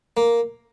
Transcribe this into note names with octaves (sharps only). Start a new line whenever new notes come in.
A#3